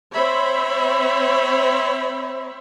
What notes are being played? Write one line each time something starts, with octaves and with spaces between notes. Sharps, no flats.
C4 C5 C#5 E5 B5